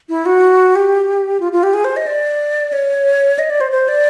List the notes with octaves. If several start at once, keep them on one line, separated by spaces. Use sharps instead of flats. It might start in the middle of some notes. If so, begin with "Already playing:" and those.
E4
F#4
G4
F4
F4
G4
G#4
C5
D#5
D5
C#5
D#5
D5
C5
C5
D5